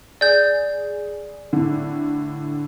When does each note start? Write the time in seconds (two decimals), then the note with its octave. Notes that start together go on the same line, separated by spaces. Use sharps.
0.21 G#4 D5 G6
1.53 A2 D3